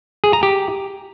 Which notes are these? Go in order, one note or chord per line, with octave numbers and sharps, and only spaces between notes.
G#4
A#5
G4